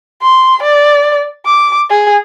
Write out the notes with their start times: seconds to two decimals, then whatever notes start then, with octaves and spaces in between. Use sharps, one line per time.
0.22 C6
0.63 D5
1.46 D6
1.90 G#4